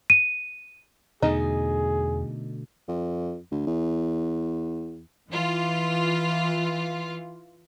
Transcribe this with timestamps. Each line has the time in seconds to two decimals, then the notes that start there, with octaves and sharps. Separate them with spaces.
0.10 D#7
1.22 E2 B2 D3 A3 D#4 G#4
2.88 F2
3.51 D2
3.67 E2
5.29 E3 F4